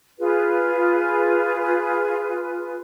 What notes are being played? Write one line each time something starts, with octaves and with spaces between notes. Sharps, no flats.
F4 G#4 B4